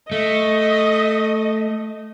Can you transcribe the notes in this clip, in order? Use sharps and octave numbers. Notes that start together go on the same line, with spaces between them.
A3 D#5